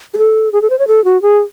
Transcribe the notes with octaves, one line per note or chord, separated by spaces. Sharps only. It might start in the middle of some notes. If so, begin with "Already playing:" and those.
G#4
A4
G#4
A4
C5
C#5
A4
F#4
G#4